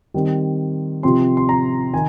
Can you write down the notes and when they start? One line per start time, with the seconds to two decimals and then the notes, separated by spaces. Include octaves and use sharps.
0.14 D#3 G3 C4
1.03 C3 F3 C4 C6
1.37 C6
1.49 A#5
1.93 D#3 G#5